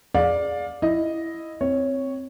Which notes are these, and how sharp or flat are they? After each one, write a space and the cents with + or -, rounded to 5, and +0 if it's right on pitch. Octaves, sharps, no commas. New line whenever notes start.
G#4 +0 D5 +0 F5 +25
E4 +0 D#5 +0
C4 +0 C#5 +0